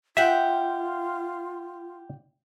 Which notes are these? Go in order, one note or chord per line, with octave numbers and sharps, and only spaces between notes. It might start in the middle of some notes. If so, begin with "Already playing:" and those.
F4 G4 E5 F#5 G5